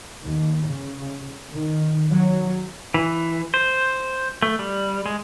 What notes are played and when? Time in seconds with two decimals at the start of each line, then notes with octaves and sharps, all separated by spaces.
0.23 D#2
0.67 C#3
1.52 D#3
2.11 F#3
2.94 E3
3.54 C5
4.42 A3
4.59 G3
5.06 G#3